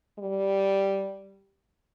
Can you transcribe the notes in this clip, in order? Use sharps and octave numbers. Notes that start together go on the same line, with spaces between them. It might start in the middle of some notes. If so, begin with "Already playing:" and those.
G3